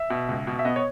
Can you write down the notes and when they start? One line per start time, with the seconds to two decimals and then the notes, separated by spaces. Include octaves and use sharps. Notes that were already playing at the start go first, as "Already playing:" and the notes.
Already playing: E5
0.10 B2
0.29 C#2
0.47 B2
0.59 E5
0.65 B3 D#5
0.76 C#5